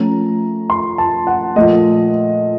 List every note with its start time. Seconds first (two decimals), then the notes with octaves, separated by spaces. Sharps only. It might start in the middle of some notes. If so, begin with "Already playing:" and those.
Already playing: F3 A3 C#4 A#5
0.70 C6
0.98 A5
1.27 F#5
1.56 A#2 F3 A3 D#5